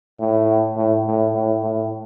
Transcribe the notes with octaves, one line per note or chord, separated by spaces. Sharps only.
A2
A2
A2
A2
A2